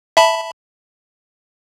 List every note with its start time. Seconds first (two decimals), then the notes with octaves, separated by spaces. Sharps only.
0.17 E5 A5 B5